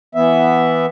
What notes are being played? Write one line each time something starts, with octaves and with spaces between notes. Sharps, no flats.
E3 B3 E5